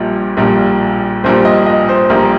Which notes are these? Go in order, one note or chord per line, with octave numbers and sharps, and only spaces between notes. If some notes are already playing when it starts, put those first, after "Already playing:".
Already playing: A#1 A#2 G3
A#1 A#2 G3
A#1 A#2 G3 C5
D#5
D#5
C5
A#1 A#2 G3 A#4